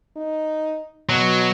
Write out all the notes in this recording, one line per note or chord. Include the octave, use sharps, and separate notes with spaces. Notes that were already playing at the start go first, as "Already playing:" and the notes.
D#4
B2 F#3